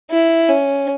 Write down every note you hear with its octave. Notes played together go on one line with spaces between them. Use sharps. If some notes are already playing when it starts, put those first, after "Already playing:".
E4
C#4